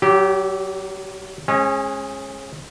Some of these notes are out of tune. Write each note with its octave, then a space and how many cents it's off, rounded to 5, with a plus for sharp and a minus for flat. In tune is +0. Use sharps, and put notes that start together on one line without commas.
F#3 +30 G4 -10
G#3 +0 C#4 -35